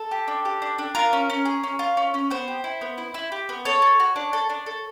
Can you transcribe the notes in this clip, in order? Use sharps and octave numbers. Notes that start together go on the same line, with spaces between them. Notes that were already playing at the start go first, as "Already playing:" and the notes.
Already playing: A4
G4
D4
G4
D4
D4
F4 A#4
C#4
C#4
G#4
C#4
F4
C#4
C#4
B3 C5
G4
E4
B3
E4
E4
G4
B3
A4 C#5
A4
F#4
D4
A4
D4
A4